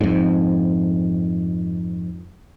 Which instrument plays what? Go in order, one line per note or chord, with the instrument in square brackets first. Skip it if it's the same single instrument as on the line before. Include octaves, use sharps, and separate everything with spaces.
[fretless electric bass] F2 G#2